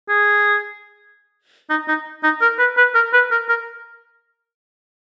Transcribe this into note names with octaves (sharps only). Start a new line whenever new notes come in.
G#4
D#4
D#4
D#4
A#4
B4
B4
A#4
B4
A#4
A#4